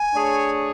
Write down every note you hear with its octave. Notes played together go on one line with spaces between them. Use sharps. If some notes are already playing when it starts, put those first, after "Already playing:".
Already playing: G#5
A3 D4 G#4 C#5